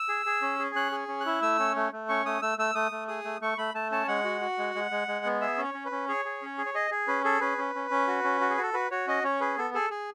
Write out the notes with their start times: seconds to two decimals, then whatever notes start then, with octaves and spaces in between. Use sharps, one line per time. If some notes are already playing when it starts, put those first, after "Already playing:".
Already playing: E6
0.09 G#4
0.26 G#4
0.42 C#4
0.59 G#4
0.75 C#4 F#6
0.92 G#4
1.08 C#4
1.21 F#6
1.26 E4
1.42 A3 E6
1.59 C#4
1.76 A3
1.92 A3
2.09 C#4 C#6
2.26 A3 D#6
2.42 A3 E6
2.58 A3 E6
2.75 A3 D#6
2.92 A3
3.08 G#4 D#6
3.25 A3
3.41 A3 C#6
3.58 A3 B5
3.75 A3 A5
3.91 C#4 A5
4.08 G#3 F#5
4.24 F#4
4.41 F#4
4.59 G#3
4.75 G#3
4.91 G#3
5.08 G#3
5.25 B3
5.41 G#4 E5
5.58 C#4
5.64 C#5
5.74 C#4
5.85 B4
5.92 C#4
6.08 G#4 C#5
6.25 G#4
6.42 C#4
6.58 G#4
6.66 C#5
6.74 G#4 D#5
6.91 G#4
7.07 C#4 B4
7.24 G#4 A4
7.41 C#4 B4
7.58 C#4
7.75 C#4
7.91 C#4
8.07 F#4
8.24 C#4
8.41 F#4
8.50 G#4
8.58 F#4 A4
8.74 F#4 B4
8.91 F#4 C#5
9.07 C#4 D#5
9.24 C#4 C#5
9.41 G#4 B4
9.58 B3 A4
9.74 G#4 A4
9.90 G#4